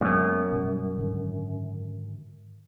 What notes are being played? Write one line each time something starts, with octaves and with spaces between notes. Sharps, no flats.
C#2 F#2 G#3 A#3 B3
B2 G3
G#2 D3 D#3